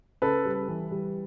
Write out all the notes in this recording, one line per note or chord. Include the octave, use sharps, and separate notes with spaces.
C#3 A4 B4
G3
E3
G3